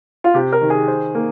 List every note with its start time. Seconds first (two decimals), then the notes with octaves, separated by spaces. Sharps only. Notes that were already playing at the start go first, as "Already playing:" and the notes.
0.24 F4
0.34 C3 G4
0.52 A#4
0.61 D#3
0.70 G#4
0.88 C5
1.15 A#3